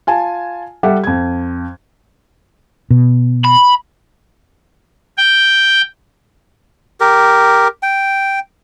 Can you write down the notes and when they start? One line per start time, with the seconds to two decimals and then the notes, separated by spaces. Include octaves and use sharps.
0.07 F4 G#5 A5
0.83 G3 G4 A4 E5 F#5
1.04 F2 G#6
2.90 B2
3.44 B5
5.18 G5
7.00 G4 A#4
7.83 G5